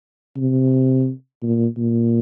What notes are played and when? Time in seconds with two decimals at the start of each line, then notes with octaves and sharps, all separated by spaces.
0.36 C3
1.42 A#2
1.77 A#2